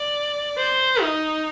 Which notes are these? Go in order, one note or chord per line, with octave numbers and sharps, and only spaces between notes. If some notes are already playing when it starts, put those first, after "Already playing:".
Already playing: D5
C5
D#4